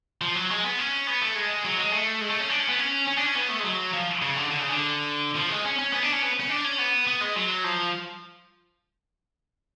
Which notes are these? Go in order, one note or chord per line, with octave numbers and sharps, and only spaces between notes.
F3
F#3
G#3
B3
C#4
B3
A3
G#3
F#3
G#3
A3
G#3
A3
C#4
D4
C#4
B3
C#4
C#4
D4
C#4
B3
A3
G#3
F#3
F3
C#3
D3
D3
C#3
D3
F3
G#3
C#4
C#4
B3
D4
C#4
B3
C#4
D4
C#4
B3
B3
G#3
F#3
F3